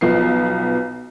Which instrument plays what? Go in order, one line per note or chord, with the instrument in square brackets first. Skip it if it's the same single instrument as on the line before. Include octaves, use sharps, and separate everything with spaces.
[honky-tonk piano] B1 F3 B3 C7